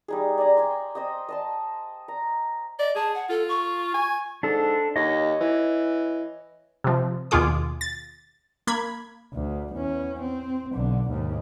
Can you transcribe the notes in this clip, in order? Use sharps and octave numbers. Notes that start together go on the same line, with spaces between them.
G3 D#4 G#4
D5 G#5 A#5
G5 G#5 C6
C5 D#5 G5 D#6
D#5 A5 C6
A#5
D5 D#5
G#4 A5
F#5
F4 A4
C#6
G#5
G#2 D4 A4
D#2 C#5 D#5
E3
C3 F3
D#2 B2 F4 G#4 D6
A6
A#3 B5 G#6
D2
E2 C#4
C4
B1 D3
D#2 G#2